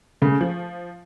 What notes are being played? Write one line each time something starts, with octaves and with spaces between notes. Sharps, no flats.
C#3 A3
F3